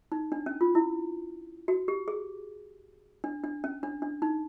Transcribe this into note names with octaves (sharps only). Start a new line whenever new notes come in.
D#4
D4
C#4
F4
E4
F#4
G4
G#4
D4
D4
C#4
D4
D4
D#4